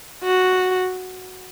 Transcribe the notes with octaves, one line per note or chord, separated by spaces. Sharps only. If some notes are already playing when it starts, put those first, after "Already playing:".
F#4